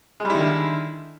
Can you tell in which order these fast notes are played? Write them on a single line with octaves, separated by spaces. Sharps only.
G#3 G3 E4 D#3 D3